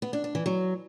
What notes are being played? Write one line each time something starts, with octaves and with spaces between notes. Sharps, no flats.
B3
D4
D4
E3
F#3